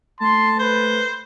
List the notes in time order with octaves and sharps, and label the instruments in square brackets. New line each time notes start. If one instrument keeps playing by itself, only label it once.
[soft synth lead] A3 [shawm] A5 [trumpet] C6
[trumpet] B4 [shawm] C5